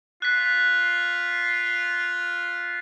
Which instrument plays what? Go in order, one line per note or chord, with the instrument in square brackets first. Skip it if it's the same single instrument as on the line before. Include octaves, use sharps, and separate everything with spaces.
[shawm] F4 [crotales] F#6 B6